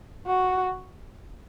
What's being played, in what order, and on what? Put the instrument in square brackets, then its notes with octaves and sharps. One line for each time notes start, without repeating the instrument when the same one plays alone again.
[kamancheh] F#4